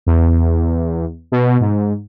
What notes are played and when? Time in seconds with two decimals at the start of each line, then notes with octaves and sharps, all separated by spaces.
0.06 E2
1.32 B2
1.60 G#2